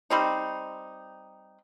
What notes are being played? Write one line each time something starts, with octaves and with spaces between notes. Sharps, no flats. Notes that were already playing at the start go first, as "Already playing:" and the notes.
G3 C4 D#4